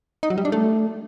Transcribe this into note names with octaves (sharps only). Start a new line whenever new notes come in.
D#4
F#3
G3
D4
A3